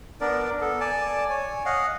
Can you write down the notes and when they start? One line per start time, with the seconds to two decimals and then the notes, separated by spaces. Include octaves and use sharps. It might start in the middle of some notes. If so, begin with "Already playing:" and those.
0.21 B3 D4 A#4 D5
0.61 B3 A4
0.81 D5 G#5 A5
1.30 C#5 G#5
1.66 D#5 F5 F#5